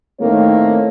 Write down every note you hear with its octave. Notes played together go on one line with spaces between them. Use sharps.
A2 D#3 A3 A#3 C4 C#5